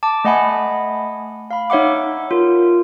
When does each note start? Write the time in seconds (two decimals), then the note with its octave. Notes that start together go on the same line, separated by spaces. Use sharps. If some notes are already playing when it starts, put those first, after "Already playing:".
0.03 A5 D6
0.24 A3 D#5 F#5 G#5 B5
1.51 F5 B5
1.70 D#4 C#5 E5 F#5 D6
2.31 F4 A#4